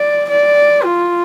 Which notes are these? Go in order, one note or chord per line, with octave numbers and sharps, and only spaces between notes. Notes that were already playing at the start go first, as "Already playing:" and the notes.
Already playing: D5
D5
F4